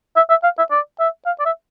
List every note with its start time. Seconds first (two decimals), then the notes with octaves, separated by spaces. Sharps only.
0.16 E5
0.30 E5
0.44 F5
0.58 E5
0.71 D5
1.00 E5
1.26 F5
1.40 D5
1.46 E5